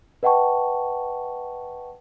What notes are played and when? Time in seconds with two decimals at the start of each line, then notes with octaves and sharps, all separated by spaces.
0.23 B4 D#5 F#5 G5 A5 C#6